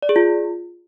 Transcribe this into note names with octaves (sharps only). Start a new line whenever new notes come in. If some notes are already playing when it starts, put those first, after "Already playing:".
D5
G#4
F4